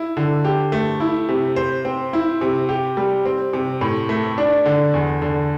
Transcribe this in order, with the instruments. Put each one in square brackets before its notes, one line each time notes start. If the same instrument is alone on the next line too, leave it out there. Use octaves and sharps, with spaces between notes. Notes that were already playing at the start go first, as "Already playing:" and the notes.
Already playing: [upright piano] E4
D3
G4
A3
E4
C3
C5
C4
E4
C3
G4
G3
C4
C3
A2
A3
D4
D3
E2
D3